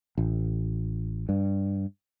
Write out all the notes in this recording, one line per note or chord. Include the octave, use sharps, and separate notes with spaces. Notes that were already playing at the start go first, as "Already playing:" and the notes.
A1
G2